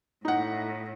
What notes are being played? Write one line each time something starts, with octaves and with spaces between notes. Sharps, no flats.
A2 D#4 F#5